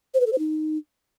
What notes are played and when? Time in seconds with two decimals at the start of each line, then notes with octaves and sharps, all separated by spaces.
0.14 C5
0.20 B4
0.26 A4
0.32 C5
0.39 D#4